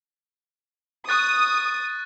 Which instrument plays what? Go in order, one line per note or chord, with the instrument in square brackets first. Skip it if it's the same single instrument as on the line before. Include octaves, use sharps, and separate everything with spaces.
[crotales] C#6 F#6 A6 [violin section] D#6